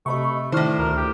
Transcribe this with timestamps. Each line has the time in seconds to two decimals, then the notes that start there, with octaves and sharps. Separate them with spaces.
0.06 C3 A3 D#5 B5 C#6
0.52 A2 D#3 D4 E4 C5 F6
0.79 D2 A#4
0.97 G4